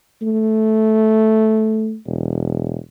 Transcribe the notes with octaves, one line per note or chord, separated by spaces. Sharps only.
A3
E1